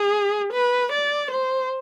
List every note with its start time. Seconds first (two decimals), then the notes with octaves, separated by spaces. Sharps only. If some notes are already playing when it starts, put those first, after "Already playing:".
Already playing: G#4
0.53 B4
0.92 D5
1.31 C5